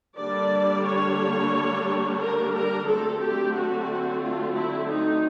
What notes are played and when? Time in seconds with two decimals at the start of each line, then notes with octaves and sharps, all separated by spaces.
0.18 D3 G3 A#3 D4 D5
0.86 C#5
2.20 A#4
2.54 A#4
2.87 D3 F#3 A3 C4 A4
3.21 G4
3.55 F#4
4.21 F4
4.55 E4
4.89 D#4